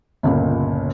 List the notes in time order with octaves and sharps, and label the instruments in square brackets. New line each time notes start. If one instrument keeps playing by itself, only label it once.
[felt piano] G1 C#2 A#2